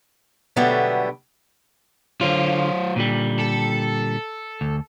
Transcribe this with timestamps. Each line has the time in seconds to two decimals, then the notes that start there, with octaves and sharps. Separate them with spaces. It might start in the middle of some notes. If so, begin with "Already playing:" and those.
0.56 B2 D3 F#3 G3 A3 B3
2.21 D3 F#3 F4 C5
2.96 A#2 D3 G3
3.39 A4
4.61 D2